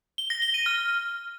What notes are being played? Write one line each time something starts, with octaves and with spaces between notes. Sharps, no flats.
G7
A#6
G7
D#7
F6